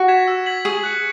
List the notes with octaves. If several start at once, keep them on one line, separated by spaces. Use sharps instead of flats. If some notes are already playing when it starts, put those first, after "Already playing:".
Already playing: F#4
G#6 B6 E7
E6
G#6 B6 F#7
G#4 C#6
F#6 C#7